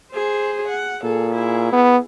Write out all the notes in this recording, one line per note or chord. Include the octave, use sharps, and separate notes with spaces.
G#4 C5
F#5
A#2 G#4 A4
E4 G#4
B3